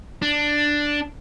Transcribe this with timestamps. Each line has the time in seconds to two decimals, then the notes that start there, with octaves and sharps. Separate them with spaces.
0.22 D4